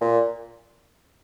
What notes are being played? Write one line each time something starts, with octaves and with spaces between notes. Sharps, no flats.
A#2